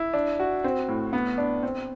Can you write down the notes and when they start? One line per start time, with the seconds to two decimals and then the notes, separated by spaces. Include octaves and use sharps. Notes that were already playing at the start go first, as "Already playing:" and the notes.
Already playing: E4
0.14 D4
0.40 F#4
0.64 C4
0.88 A2
1.13 B3
1.38 D4
1.63 C4